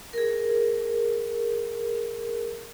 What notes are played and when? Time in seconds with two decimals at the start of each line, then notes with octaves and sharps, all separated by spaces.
0.13 G#4 A#4